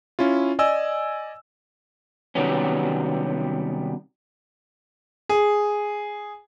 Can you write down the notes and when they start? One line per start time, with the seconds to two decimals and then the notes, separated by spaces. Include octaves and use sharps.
0.19 C#4 E4 F4
0.59 D5 D#5 G#5 E6
2.35 C3 D#3 F#3 G3 B3 C#4
5.29 G#4